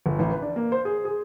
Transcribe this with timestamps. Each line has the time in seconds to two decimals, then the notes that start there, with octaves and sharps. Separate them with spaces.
0.06 G1
0.19 A1
0.31 B4
0.42 D4
0.56 A#3
0.72 C5
0.85 G#4
1.05 G#4